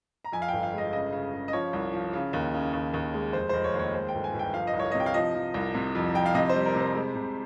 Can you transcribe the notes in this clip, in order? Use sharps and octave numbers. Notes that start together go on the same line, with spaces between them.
A#5
F2 G#5
F5
G1 G5
F5
G#3 D#5
C#3 D#5
C#3
C#3
D#5
F3 C#5
C2
F3
C#3
D#2
C#3
D#2
D#2
G#3
F1 C5
F1 C5
C#5
D#2
C#5
G#3 C5
G5
G1
G#5
G1
G5
F3 F5
D#5
C2
C#5
C3 D#5
G5
F5
F3 D#5
F3
C2
C3
F2
F2 G5
F5
C3 D#5
C5
G3
A#4
C3
C5
G#3
C3